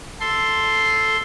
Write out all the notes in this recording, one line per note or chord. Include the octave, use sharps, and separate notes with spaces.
A4 C6